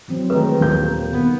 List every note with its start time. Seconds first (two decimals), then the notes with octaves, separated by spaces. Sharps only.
0.08 E3 F#3 C4
0.30 D#3 G#3 A3 B4
0.60 D#1 A#3 G6
1.13 B2 D#3 B3